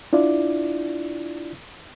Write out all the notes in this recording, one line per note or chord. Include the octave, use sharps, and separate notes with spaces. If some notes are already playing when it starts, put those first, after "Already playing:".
D4 E4 F4 D5